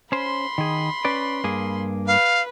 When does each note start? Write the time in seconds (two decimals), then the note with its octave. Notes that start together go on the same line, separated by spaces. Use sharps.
0.12 C#4 C5 B5 C6
0.58 D#3 G#4
1.05 C#4 B4 D5
1.44 G2 A#3 G#4
2.07 B4 F5